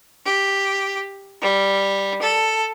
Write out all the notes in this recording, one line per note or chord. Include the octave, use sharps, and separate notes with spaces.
G4
G3
A4